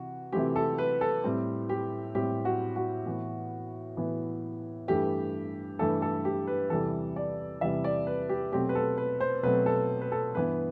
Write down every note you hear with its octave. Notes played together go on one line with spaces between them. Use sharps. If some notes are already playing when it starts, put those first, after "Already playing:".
Already playing: C3 E3 F#4
C3 E3 A3 C4 G4
A4
B4
A4
A2 G3 C4
G4
A2 G3 C4 G4
F#4
F#4
A2 E3 B3
A2 E3 B3
G2 E3 A3 G4
G2 E3 A3 A4
A4
G4
B4
E2 C3 E3 G3 A4
D5
E2 C3 E3 G3 E5
D5
B4
G4
B2 F#3 A3 C4 G4
B4
A4
B4
C5
B2 F#3 A3 C4 B4
A4
B4
A4
G2 E3 B3 B4